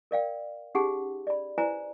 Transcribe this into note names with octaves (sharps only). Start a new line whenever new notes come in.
A#4 D5 F5 G5
C#4 D#4 G4 G#4 F#5 C6
D5 B5
E4 B4 C5 D5 G#5 A#5